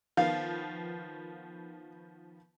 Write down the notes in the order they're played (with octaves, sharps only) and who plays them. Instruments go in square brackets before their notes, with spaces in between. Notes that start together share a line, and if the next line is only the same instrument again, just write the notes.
[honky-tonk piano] D#3 F3 B3 [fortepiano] F5